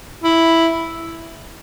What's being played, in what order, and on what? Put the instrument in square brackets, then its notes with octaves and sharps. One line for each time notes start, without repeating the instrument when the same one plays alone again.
[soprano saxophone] E4